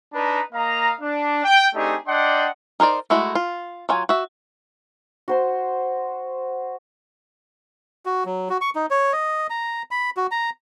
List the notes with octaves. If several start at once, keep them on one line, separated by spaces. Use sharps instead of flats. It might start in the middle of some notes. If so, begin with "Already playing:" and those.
D4 D#4 B4 A#5
A#3 D#5 F5 A#5
D4
G5
A3 C4 D4 D#4 G4 G#4
D4 D5 D#5 F#5 G5 C6
D#4 A#4 C5 D5
G#3 A3 E4 F#4
F4
F#3 F4 G#5
F#4 E5
F#4 C5 C6
F#4
F#3
F#4
C#6
D#4
C#5
D#5
A#5
B5
F#4
A#5